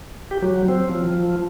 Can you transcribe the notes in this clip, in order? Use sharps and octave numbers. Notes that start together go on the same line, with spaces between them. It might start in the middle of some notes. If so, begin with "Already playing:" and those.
G4
F#3
C4
F3
F3